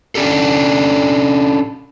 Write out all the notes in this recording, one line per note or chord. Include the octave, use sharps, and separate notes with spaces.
C#4 D4 G4 A4